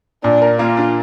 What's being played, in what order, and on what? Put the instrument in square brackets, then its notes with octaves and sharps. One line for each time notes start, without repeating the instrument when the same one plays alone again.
[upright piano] A#2 [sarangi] D4
[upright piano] A#4
[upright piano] A#3 [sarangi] F4
[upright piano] D4